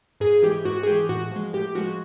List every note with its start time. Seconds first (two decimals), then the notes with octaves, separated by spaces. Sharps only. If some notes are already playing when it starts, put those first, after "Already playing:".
0.20 G#2 G#4
0.43 E3 G#3 G4
0.65 G#2 F#4
0.83 G#4
0.87 E3 G#3 G4
1.09 A2 F#4
1.32 F3 G#3
1.53 A2 G4
1.75 F3 G#3 F#4